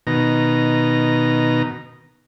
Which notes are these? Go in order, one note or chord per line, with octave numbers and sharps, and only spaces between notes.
B2 D#3 A#5